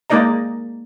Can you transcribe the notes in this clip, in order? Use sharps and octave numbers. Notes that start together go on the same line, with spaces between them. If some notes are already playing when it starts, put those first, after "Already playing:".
G#3 A#3 D#4 D5 D#5 A#5